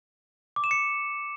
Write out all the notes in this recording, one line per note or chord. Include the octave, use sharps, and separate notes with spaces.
D6
E7
C#7